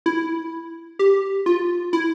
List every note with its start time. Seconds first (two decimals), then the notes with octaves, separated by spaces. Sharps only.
0.06 E4
0.99 G4
1.46 F4
1.93 E4